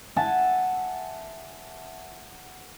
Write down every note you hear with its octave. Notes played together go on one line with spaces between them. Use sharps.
E5 F#5 G#5 A5